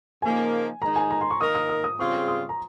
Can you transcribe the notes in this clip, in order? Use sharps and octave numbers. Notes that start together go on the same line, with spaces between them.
C#3 F3 A#3 D#4 G#5
D#3 G#3 D#4 A#5
G#5
A#5
C6
C#6
D#3 A#3 D#4 A#4 D#6
D#6
D#6
D#6
C#3 G3 C4 F4 G#4 C#6
C6
D#6
A#5